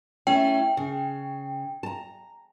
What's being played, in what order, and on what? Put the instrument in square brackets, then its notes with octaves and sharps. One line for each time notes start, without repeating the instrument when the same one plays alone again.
[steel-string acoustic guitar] A3 C#4 E4 [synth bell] G5
[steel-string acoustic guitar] C#3
A5 A#5